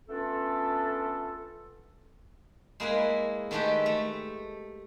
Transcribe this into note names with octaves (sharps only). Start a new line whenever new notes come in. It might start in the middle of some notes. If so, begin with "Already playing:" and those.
A3 B3 C#4 D4 F4 A4
G#3 A#3 E4 G#4 B4
D#3 G#3 A3 G4 A4 B4
A3